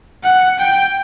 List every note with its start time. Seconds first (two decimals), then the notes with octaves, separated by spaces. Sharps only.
0.23 F#5
0.59 G5